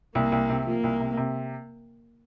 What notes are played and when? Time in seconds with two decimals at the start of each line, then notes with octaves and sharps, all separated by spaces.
0.15 C2 A#3
0.32 C2
0.49 C3
0.66 F3 A#3
0.84 C2
1.00 C3
1.17 C3